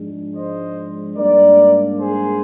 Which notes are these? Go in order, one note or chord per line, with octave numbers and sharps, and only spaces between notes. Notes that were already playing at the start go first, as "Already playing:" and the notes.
Already playing: G#2 F3 G#3 D4
C5 D#5
G#2 G3 A#3 D4 A#4 D5
G#4 C5